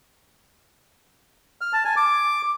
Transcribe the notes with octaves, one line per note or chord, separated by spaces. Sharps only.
F6
A5
G#5
D6